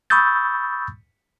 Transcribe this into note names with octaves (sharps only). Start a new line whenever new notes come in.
B5 C#6 D#6 E6 G6 A6